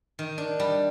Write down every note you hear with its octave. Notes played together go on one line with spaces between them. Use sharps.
D#3
D4
G3